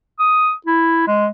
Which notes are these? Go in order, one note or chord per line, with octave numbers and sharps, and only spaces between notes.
D#6
E4
G#3